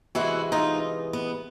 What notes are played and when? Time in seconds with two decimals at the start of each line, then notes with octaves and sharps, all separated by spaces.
0.15 C3 E3 G#3 B3 E4 F#4
0.52 D#4 F4
1.13 B3